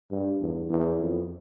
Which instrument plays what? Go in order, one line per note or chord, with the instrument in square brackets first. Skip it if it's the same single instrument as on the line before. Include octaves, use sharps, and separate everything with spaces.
[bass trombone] G2
E2
E2
F2